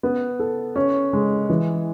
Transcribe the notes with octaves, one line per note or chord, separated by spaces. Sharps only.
B3
A4
C#4
G#3
E3